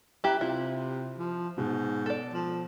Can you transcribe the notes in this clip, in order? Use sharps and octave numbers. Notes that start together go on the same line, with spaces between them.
E4 G4 E5 A#5 F#6
C3 E4 F4
F3
G#2 B2
A4 D5
F3